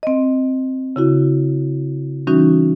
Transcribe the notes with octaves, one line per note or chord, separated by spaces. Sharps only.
C4 D#5
C#3 E4 F#4
E3 G3 C#4 D#4 F#4